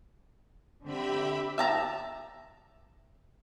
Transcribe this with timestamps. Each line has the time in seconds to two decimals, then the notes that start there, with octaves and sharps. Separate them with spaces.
0.84 D3 C4 G4 E5 B5
1.58 E5 A5 A#5